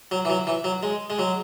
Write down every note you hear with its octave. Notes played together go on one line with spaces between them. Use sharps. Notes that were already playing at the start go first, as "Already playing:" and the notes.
F#3
E3
F#3
E3
F#3
G#3
G#3
F#3